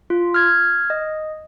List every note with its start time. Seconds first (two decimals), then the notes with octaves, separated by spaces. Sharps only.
0.10 F4
0.34 F6 G#6
0.90 D#5